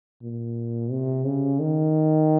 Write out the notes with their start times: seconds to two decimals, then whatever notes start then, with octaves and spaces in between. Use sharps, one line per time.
0.22 A#2
0.91 C3
1.25 C#3
1.59 D#3